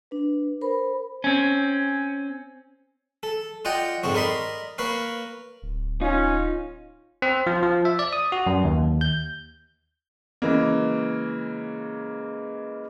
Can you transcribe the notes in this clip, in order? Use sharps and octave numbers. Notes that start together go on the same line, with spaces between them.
D4 B4
A#4 C5 B5
C4 C#4
A4
F4 D5 D#5 F#5 G5
F2 G#2 D3 C4 C#5
A#4 D5 D#5 B5 C6
A#3 B4 C#5 F5
D1
C#4 D#4 F4
C4
F3
F3
E5
D5
D#6
F#4
F#2
D#2
G6
C#3 E3 G#3 A#3